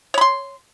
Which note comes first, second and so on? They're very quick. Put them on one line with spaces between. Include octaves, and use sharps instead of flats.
C#5 B5 C6